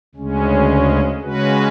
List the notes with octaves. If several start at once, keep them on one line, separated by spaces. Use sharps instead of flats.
D2 C#3 G#3 C#4
C#3 G#3 C#4 F#4 B4